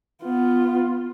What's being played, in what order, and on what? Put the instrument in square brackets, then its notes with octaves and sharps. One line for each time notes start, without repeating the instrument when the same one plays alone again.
[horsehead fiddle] B3 F4